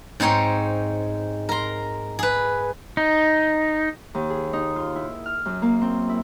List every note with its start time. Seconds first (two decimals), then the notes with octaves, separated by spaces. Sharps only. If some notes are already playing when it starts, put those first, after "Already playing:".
0.20 G#2 C4 D#4 C#5 G5
1.49 A#4 C6
2.19 G#4 B4
2.97 D#4
4.15 D#2
4.30 G#4
4.53 D#4
4.76 F4
4.96 E4
5.26 F6
5.46 F#2
5.62 A#3
5.82 C4
6.09 E4